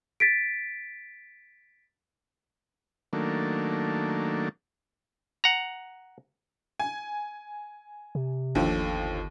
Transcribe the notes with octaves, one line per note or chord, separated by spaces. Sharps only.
A6 B6 D7
D#3 F#3 A3 A#3 D4
F#5 A#5
G#5
C3
G1 D#2 D3 F3